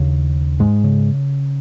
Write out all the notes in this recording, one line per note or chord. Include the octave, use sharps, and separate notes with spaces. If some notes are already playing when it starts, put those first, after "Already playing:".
Already playing: D#2 C#3
G#2 G#3
C#3